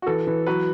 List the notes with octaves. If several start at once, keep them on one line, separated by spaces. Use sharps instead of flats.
F#4
E3 A4
E3
F#3 B4